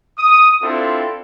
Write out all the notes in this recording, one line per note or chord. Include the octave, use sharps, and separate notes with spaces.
D#6
C4 D4 E4 F4 A4